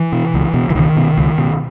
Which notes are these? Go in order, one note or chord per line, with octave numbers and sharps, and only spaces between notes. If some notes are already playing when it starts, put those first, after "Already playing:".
Already playing: E3
B2
C#2
B2
E3
C#2 D#3
B2
C#2
B2